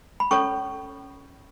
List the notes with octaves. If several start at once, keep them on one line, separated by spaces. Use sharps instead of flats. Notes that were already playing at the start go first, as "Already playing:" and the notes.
B5
C#4 A4 C#5 C#6